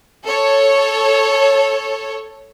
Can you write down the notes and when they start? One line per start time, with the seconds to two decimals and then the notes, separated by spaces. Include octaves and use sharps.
0.25 A4 C#5